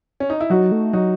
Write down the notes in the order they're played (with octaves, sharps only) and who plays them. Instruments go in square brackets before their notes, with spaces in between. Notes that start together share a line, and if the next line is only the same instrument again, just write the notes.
[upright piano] C#4
D#4
E4
[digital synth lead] F#3 [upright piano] D#4 F#4
[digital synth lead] A3
[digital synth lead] F#3 [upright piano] D#4 F#4